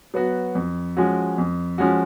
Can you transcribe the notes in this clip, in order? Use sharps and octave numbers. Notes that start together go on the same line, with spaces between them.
F#3 B3 F#4
F2
F3 G#3 C#4 F#4
F2
F3 G#3 C#4 F#4